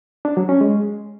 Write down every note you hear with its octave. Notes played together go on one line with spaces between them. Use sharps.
D4
F#3
C#4
G#3